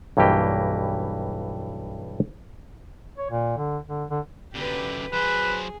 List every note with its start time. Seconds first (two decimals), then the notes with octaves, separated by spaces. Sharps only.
0.17 B1 G2 E3 A#3 G4 D#5
3.18 C#5
3.31 A#2
3.57 D3
3.88 D3
4.10 D3
4.54 F#2 D3 G4 B4
5.13 F#3 G#4 B4 C5